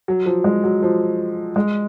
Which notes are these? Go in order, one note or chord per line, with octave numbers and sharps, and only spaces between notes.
F#3
F3
G#3
F#3
F3
G#3